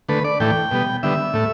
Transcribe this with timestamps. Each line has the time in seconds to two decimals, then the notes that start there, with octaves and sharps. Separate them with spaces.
0.09 D3 A3 B4
0.25 D5
0.40 A2 E3 A3 G5
0.71 B2 G3 B3
1.03 D3 G3 B3 E5
1.33 A2 A3